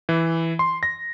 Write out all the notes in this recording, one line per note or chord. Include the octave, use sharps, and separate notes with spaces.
E3
C6
A#6